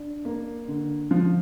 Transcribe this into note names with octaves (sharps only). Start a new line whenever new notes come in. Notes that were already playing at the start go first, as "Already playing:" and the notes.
Already playing: D4
A#3
D3
F3